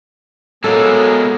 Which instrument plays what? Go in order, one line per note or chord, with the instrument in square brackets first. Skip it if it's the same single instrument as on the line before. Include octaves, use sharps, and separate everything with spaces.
[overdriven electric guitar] B2 G#3 [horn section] F#3 G#4 [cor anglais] A#3 [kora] A4